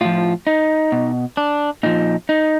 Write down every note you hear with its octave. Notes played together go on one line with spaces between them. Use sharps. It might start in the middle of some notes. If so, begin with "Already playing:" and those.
A2 F3 F4
D#4
B2
D4
A#2 F3 D#4
D#4